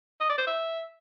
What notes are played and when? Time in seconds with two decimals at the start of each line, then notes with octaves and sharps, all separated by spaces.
0.21 D#5
0.29 D5
0.38 C5
0.47 E5